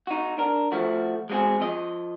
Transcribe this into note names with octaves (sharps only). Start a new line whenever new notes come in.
D#4 F#4
D4 A#4
F3 A3 F#4
G#3 C4 F4 F#4 G#4
F3 D#5